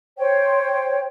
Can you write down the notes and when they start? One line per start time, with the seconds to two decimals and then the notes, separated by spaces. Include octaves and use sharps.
0.19 C5 C#5 G5